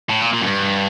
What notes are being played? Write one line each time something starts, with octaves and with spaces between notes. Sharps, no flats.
A2
A#2
A#2
F#2
G2